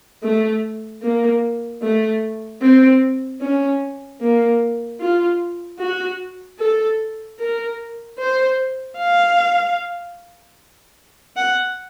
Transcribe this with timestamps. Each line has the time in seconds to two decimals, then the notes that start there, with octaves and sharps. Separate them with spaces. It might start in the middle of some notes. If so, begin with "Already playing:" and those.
0.23 A3
1.02 A#3
1.82 A3
2.62 C4
3.41 C#4
4.21 A#3
5.00 F4
5.80 F#4
6.59 A4
7.40 A#4
8.19 C5
8.98 F5
11.36 F#5